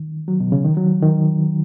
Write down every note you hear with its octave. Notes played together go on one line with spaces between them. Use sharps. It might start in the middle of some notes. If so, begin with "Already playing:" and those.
Already playing: D#3
F#3
B2
C#3
D#3
F#3
D#3